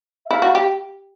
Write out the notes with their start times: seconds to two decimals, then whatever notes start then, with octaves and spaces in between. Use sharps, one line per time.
0.26 E5
0.30 E4 F5
0.42 F#4
0.55 G4